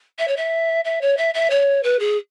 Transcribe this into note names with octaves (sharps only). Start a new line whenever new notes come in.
E5
C#5
E5
E5
C#5
E5
E5
C#5
B4
G#4